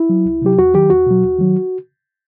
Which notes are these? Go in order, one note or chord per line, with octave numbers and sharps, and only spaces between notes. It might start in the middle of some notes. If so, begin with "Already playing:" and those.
Already playing: E4
F#3
C2
C3 F#3 G4
E2 F#4
D#3 F#3 G4
E2 F#4
B2 F#3
D#2
D#3 F#3